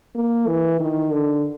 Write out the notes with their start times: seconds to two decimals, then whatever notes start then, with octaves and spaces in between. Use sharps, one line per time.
0.15 A#3
0.47 E3
0.80 D#3
1.12 D3